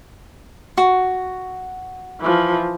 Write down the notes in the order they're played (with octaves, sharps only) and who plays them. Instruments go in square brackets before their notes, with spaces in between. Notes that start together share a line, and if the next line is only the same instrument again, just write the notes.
[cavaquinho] F#4
[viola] E3 F3